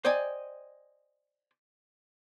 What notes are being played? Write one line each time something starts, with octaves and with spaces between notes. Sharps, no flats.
C5 D5 D#5 G5 G#5